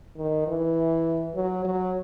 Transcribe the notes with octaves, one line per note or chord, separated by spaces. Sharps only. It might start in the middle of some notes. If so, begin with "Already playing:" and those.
D#3
E3
F#3
F#3